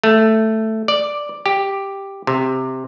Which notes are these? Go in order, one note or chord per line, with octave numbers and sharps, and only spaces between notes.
A3
D5
G4
C3